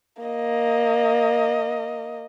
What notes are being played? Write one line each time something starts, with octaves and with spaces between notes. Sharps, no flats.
A#3 D#5